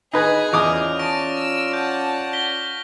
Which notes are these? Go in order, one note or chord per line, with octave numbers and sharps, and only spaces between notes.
D#4 G#4 B4 D#5 G#5
E2 C#4 F4 D5 D6 D#6 F6 F7
A5 C#6 A#6 D7
E6
F#5 A5 G6
A#6 B6 G7